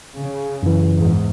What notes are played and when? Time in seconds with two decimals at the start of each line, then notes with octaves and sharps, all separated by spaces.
0.19 C#3
0.63 F#2 E3
0.97 E2 G#2